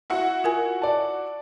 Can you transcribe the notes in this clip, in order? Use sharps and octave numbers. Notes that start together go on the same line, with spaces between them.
E4 F#4 F#5
F4 A#4 G#5
D5 A5